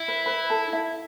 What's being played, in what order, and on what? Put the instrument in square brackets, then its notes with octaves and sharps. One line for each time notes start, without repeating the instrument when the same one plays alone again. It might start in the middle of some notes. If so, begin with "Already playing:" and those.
Already playing: [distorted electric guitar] E4
[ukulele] B4
B4 B5
A4 A5
E4 E5